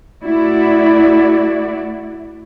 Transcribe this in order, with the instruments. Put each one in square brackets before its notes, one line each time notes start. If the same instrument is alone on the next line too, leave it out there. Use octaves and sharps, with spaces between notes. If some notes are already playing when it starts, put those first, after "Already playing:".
[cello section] A3 E4 F#4 D5